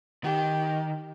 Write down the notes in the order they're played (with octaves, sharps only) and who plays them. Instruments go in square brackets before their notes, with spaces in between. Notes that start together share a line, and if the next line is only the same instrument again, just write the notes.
[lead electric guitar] D#3 [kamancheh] G4